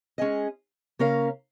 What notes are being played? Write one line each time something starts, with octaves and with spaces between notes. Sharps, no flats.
G#3 C#4 G#4 D#5
C#3 A#3 C#4 A#4 F5